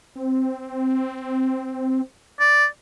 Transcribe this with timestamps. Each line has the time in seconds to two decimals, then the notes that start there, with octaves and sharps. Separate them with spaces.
0.15 C4
2.40 D5